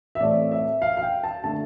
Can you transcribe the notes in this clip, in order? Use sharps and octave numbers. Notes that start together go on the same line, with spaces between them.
E5
A2 E3 A3 C4 D5
E5
F5
F5
G5
A5
D3 A3 A5